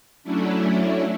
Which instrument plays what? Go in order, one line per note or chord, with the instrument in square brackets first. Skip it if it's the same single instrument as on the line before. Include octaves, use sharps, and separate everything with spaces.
[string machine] F#3 A3 C#4 D4 E4